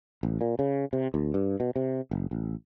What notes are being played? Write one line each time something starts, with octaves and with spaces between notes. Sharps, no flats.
A1
A#2
C#3
C3
D2
G2
B2
C3
F#1
A1